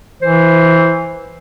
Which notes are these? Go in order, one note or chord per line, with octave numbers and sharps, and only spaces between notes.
E3 C5